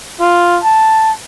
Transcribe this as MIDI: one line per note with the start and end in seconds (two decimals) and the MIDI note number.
0.21 0.59 65
0.64 1.12 81